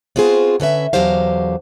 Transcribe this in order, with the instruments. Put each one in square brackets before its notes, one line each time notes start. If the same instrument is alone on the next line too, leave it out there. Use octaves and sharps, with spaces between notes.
[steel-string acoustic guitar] B3 C4 F4 F#4 G#4 C5
D3 C#4 B4 E5
E2 D3 F#3 G4 C5 F5